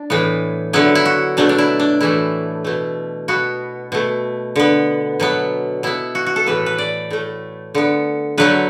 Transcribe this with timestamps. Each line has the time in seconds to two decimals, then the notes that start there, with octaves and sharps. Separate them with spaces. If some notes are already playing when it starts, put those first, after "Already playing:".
Already playing: D4
0.10 A2 E3 B3
0.73 D3 F#3 B3 E4
0.95 E4
1.06 F#4
1.37 B2 F#3 A3 D4
1.49 D4
1.58 E4
1.80 D4
2.01 A2 E3 A3 E4
2.64 B2 A3
3.28 B2 B3 F#4
3.92 B2 A3
4.56 D3 B3
5.20 B2 F#3 B3
5.83 B2 B3 E4
6.15 F#4
6.26 F#4
6.36 A4
6.46 A2 E3 B3 B4
6.66 B4
6.78 D5
7.10 A2 A3
7.75 D3 B3
8.38 D3 F#3 A3 B4